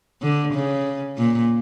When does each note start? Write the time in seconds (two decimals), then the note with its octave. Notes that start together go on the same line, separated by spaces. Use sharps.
0.22 D3
0.54 C#3
1.18 A#2